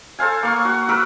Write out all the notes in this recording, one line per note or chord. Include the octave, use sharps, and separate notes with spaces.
A4 C5 F5 G#5
A#3 F5 C#6
F#4 F#5
A#4 B4 F#5 E6